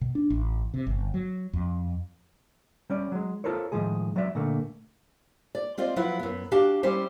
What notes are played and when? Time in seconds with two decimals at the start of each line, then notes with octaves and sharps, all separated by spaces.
0.01 B2
0.15 D4
0.30 A1
0.74 C3
0.87 G1
1.14 F#3
1.53 F2
2.90 G3 C#4 D5
3.12 F#3 G#3
3.44 F4 F#4 A4 A#4 C5 C#5
3.72 A2 D#3 F3 G#3 G#4
4.16 F#3 F#4 D5 E5
4.35 A#2 D3 A3 A#3
5.55 D5
5.78 C4 F4 C5 D5 D#5
5.96 F3 F#3 E4 F4 B4
6.19 F#2 B3
6.52 D4 F#4 G4 F5 A5
6.83 G3 C#4 E4 G4 C5